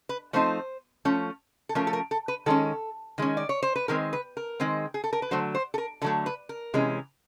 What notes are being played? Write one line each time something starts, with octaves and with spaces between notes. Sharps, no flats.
B4
F3 A3 C4 D#4 C5
F3 A3 C#4
A4
F3 A3 C#4 A#4
A4
A#4
A4
B4
D#3 G#3 C#4 A4
D#3 G#3 C#4
D5
C#5
C5
B4
D#3 G#3 C4 A#4
B4
A#4
D#3 G#3 C4
G#4
A4
A#4
B4
D3 F#3 A3 C5
C5
A4
A#4
D3 F#3 A3 A4
B4
A#4
C3 E3 G#3 C#4